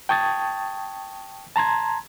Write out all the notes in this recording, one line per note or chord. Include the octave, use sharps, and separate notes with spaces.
G5 A5 C#6 D#6 G#6 A6
A5 A#5 C6 G#6